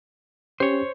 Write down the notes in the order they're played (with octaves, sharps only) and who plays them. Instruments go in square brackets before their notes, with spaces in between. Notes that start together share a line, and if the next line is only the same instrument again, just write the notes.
[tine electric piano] C#4 G4 [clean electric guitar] C5 C#5